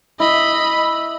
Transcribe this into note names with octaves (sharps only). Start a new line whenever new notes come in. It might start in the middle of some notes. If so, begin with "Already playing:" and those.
E4 D#5 B5